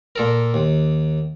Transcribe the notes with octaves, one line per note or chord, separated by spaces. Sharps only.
A#2 A4 A#4
D#2